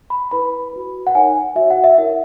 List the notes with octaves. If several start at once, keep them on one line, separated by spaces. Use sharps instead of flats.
B5
E4 B4 B5
F#4 B4
F#5
D#4 A#4 C#5 G#5
F#4 C#5 E5
F#5
E5
E4 A#4 C#5 F#5